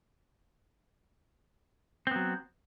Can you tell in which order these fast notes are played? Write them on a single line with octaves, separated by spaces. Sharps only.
C4 B3 F#3